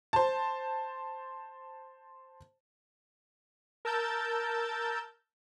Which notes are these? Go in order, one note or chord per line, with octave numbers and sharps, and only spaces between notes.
C5 A5
A#4 A5 E6 G6 A6